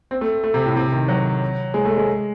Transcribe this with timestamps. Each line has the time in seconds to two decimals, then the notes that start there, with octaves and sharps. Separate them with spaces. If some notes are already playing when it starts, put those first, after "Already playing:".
0.11 C4
0.21 A3
0.44 A3
0.54 C3
0.66 A2
0.76 C3
0.92 D#3
1.08 F#3
1.74 G#3
1.85 A3
1.96 G#3